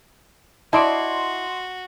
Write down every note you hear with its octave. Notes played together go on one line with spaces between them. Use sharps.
E4 F#4 D5 D#5 A5 C6 D7